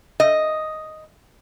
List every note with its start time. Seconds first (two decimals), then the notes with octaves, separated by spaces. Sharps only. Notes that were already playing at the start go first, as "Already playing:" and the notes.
0.20 D#5